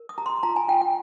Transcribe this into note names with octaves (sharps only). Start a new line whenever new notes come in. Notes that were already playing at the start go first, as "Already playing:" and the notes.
Already playing: A#4
D#6
G4 A#5
C6
F4 A#5
G#5
F4 G5
G5